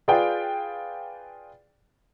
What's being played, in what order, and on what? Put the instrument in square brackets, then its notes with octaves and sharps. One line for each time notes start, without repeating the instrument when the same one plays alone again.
[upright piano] F4 G#4 B4 D5 F5 G5